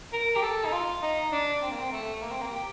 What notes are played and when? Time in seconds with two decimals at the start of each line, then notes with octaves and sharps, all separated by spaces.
0.13 A#4
0.36 G4
0.43 A4
0.65 D#4
0.73 F4
1.02 D#4
1.32 D4
1.62 C4
1.71 A#3
1.80 C4
1.92 A3
2.21 A#3
2.31 C4
2.42 A#3
2.52 G4